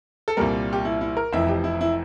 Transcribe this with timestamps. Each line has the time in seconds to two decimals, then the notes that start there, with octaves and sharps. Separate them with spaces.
0.28 A4
0.37 C2 A#2 G3 A#4
0.73 G4
0.85 E4
1.01 E4
1.17 A#4
1.33 F1 F2 E3 E5
1.48 G4
1.64 E4
1.81 E4